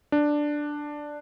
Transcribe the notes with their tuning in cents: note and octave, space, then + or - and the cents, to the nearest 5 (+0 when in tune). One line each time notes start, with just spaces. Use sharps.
D4 +5